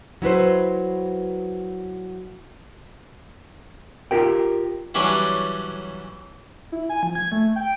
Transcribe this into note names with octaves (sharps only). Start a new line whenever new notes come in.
F#3 E4 B4 C5
F4 G4 A#4 G5
E3 F#3 G3 C#4 D4
E4
G#5
F3
G#6
A3
G5